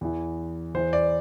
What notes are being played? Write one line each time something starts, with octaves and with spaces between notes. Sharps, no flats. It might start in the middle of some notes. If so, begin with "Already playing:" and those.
E2 E3
E2 E3 C5
D5